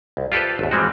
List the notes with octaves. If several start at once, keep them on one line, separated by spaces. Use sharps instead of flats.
C2
F4 G4 A4 B4 C5
G#1 D#2
E3 G3 G#3 C4 F#4